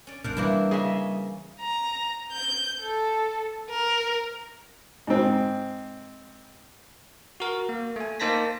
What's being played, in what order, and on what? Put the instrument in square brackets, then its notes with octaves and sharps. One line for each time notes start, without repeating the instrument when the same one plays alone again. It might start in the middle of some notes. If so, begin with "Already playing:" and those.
[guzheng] C#4 D5
[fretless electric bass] G#1 G#2 B2 [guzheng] D4 C5 F#5 [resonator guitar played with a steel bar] A#4
[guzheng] E3 D4 F#4 [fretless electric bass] G3 [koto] A#3 E4
[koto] C#3 [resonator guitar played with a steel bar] G#4 D#5 E5
[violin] A#5
G6
A4
A#4
[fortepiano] G#2 C4
[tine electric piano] F#4 A#4
A#3
A3 G#5
A#3 D#4 C5 A5 A#6 B6